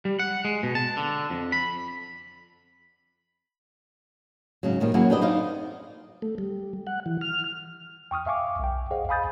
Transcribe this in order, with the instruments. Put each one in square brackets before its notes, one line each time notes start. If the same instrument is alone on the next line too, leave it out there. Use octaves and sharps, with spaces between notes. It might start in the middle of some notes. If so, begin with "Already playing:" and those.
[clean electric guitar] G3
F#5
G#3
B2
A5
D3
F2
B5
[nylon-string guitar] G#2 C#3 F#3
A#2 D#3 F3 G3
F#3 A#3 C#4 E4 F#4 G#4
D4 G4 B4 D5 D#5
D#4 C5 D5 D#5 F5
[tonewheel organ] A3
G3
F#5
E3
F6
[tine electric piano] G5 C#6 D#6 F6
E5 F5 G#5 C#6 D6
B1 G5
G#4 C5 D#5 F5 F#5
F5 G#5 B5 D#6 G6 A6